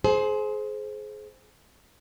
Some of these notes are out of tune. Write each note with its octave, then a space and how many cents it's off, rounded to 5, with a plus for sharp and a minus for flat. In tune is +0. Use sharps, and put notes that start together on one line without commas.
G#4 +30 C5 +0